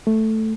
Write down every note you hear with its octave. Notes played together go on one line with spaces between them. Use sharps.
A3